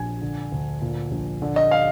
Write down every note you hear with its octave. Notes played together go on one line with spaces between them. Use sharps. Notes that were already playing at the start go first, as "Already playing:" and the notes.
Already playing: A#1 G#5
D3
D2
A#2
A#1
D3
D#5
F5